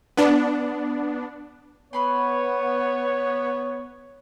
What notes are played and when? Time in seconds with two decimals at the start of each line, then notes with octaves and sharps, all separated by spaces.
0.17 B3 D4
1.93 B3 B4 C#5 B5 C6